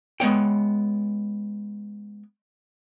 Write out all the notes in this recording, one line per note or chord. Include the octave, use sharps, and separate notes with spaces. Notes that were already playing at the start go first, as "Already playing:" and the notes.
G#3 B3 C#5 G5